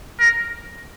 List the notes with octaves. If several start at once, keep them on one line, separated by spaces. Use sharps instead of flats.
A#4